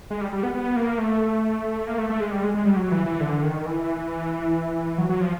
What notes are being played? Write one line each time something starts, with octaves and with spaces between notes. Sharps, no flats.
G#3
G3
G3
B3
B3
A#3
A3
A#3
A3
A3
G#3
G3
G#3
G#3
G3
F#3
E3
E3
D3
D#3
E3
F#3
F#3
F3